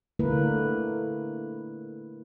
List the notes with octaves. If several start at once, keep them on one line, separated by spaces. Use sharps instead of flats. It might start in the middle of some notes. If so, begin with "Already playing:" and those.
D3 A3 A#3 E4 A#4 B4